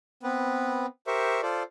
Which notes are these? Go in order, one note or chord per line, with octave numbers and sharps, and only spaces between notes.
B3 C4 B4
G4 A#4 C5 E5 C#6
F4 A4 C5 D5